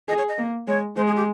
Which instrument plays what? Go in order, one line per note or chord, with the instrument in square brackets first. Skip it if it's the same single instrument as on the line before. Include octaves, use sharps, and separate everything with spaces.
[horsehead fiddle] G#4 [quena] D#5
[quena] C#5
D#5
[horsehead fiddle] A#3
[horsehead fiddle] G#3 [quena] C#5
[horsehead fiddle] G#3 [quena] C5
[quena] G#4
G4